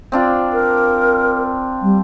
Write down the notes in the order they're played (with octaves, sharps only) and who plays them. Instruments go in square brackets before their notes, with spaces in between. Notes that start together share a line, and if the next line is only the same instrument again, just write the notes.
[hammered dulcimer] C4 D4 F4
[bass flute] A#4
G3